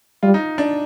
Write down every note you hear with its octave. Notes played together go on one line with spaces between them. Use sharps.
G3 F4
D#4
D4